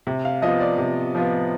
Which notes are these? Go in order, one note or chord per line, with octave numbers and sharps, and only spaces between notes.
C3
F5
F3 B3 F4 D#5
D5
C3
F3 B3 F4